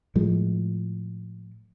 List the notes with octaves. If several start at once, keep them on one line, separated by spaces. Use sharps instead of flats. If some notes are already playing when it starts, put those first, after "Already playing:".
A2 F3 G#3